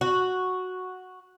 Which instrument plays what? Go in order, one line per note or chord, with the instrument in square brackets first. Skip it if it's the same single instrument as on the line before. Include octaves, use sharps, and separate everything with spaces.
[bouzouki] F#4